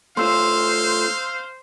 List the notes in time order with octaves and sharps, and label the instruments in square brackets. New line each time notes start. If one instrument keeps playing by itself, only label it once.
[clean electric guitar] A3 C#4 F4 [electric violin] C5 [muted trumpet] F5 [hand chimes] C6 E6